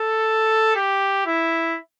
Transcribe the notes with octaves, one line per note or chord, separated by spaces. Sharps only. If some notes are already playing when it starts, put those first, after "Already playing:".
Already playing: A4
G4
E4